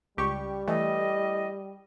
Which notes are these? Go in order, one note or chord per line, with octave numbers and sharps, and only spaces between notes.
C#2 G3 G4 C#6
E3 A3 D#5